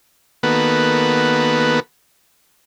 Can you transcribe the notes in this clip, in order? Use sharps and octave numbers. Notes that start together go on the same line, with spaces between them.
D#3 A#3 B3 F#4 A4 B4